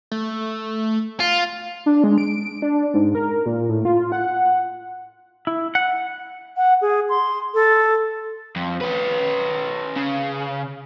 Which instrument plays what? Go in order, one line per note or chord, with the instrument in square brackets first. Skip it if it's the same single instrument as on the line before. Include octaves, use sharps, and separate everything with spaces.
[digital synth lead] A3
[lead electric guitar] F4
[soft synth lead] D4
G#3
D7
D4
G#2
A#4
A#2
A2
F4
F#5
[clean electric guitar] E4
F#5
[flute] F#5
G#4
C6
A4
[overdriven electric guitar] F2
C#4 B4
C#3